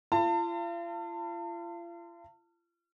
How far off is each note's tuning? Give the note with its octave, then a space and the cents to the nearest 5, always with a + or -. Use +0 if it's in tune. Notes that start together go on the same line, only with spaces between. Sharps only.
F4 -40 A5 +35